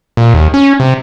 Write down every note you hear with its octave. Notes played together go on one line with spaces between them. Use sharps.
A#2
D#2
C#4
C3